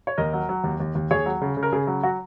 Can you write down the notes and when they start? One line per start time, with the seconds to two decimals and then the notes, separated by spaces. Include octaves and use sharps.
0.07 C#5
0.18 D#2 A#4 D#5
0.33 F#3
0.49 F#3
0.64 D#2
0.80 D#2
0.95 D#2
1.11 D#2 G#4 C#5
1.26 F#3
1.41 C#3
1.57 C#3
1.63 A#4
1.72 C#3 G#4
1.87 F#3
2.03 F#3 F#4